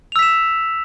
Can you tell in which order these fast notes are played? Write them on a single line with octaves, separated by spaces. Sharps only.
F7 E6 B6 E7